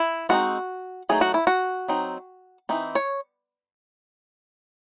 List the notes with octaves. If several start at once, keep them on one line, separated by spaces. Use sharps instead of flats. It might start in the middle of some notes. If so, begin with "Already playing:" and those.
Already playing: E4
G#3 C4 D#4 F#4
F#3 A3 D#4 G#4
F#4
E4
F#4
F#3 C4 D#4
E3 C4 D#4
C#5